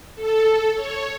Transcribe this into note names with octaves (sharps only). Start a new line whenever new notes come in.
A4
C#5